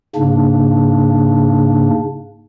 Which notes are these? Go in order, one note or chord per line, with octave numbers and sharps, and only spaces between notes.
G#2 C#3 A#3 D4